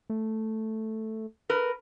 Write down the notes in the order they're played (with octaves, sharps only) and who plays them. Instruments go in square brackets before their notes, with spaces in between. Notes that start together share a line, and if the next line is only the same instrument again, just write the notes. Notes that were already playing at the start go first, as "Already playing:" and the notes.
[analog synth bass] A3
[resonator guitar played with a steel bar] A#4 B4